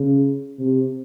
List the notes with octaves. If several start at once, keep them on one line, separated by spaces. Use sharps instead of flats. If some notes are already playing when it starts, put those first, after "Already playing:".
Already playing: C#3
C3